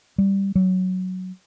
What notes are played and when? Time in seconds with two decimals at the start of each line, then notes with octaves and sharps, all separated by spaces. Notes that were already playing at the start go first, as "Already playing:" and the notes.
0.18 G3
0.55 F#3